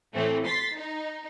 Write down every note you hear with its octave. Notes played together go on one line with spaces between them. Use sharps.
A2 E3 A3 C4
C6 A6 B6 C7
D#4